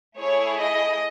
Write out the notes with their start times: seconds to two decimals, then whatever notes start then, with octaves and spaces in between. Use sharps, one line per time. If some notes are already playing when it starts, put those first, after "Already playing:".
0.19 A3 E4 G#4 C#5
0.60 D#5